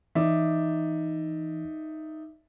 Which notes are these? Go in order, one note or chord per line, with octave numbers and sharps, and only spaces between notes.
E3 D#4 D5 E5